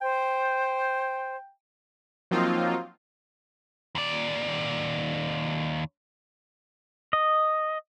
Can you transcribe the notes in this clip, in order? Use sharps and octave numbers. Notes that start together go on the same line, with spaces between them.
C5 G5
F3 F#3 A#3 C4 D#4 F4
D#2 D5
D#5